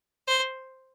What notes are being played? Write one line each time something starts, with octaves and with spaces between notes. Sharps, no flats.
C5